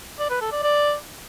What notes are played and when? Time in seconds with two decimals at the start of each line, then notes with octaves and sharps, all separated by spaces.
0.19 D5
0.30 B4
0.41 A4
0.52 D5
0.63 D5